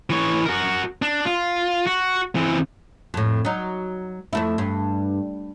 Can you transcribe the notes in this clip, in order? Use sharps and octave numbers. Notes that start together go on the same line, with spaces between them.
E3 C#5
F#4 A#4
D4
F4
F#4
E3 C4
F2 A2
F#3 D#4
F2 A3 E4
G2